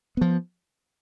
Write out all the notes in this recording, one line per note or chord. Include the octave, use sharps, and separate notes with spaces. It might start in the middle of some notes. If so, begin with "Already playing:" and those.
F3 B3